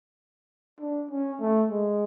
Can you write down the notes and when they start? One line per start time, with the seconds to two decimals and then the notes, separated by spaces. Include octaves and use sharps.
0.81 D4
1.11 C#4
1.41 A3
1.70 G#3